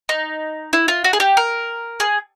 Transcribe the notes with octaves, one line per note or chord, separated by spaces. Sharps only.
D#4
E4
F4
F#4
G#4
G4
A#4
G#4